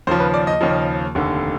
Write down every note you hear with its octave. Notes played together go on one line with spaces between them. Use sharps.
D#2 C#3 F3 C5
B4
D5
D#5
D#2 C#3 F3
F1 D#2 D3